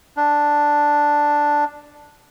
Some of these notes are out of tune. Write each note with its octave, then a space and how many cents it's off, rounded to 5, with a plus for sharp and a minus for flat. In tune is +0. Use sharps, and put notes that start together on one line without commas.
D4 +0